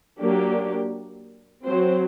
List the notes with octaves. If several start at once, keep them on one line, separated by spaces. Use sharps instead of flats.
F#3 A#3 D4 G4
F#3 C4 C5